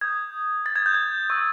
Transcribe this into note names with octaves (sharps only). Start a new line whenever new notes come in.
D#6 G6 G#6
A6
G#6
G6
G#6
C#6 E6 G6